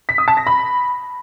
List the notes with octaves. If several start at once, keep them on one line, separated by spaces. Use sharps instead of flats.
B6
D#6
A5
A#6
B5